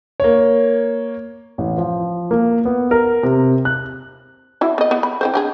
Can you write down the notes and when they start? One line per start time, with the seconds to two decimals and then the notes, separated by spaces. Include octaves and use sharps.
0.20 A#3 C#5
1.58 A1
1.78 F3
2.31 A#3
2.65 B3
2.91 A#4
3.23 C3
3.65 F#6
4.61 E4 F#4
4.78 B3 D#5
4.91 B3
5.03 B5
5.21 E3 C4 C5
5.34 D4 G4 G#4